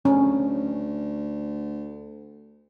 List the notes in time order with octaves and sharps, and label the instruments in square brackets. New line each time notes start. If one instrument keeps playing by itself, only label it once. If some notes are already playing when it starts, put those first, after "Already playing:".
[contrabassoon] D2 [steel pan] C#4